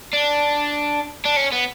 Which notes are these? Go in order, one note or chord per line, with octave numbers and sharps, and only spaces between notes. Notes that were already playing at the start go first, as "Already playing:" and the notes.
D4
D4
C#4
B3